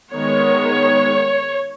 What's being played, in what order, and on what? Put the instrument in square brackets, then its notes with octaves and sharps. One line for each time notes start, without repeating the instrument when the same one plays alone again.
[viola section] D#3 G#3 B3 C#5